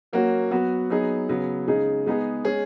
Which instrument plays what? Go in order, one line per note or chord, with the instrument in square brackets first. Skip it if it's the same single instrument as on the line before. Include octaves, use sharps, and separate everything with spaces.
[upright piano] F#3 A#3 C#4 F#4
F#3 B3 F#4
F#3 B3 D#4 G#4
C#3 F#3 B3
C#3 G#3 D#4 G#4
G#3 B3 D#4 G#4
G#3 C#4 G#4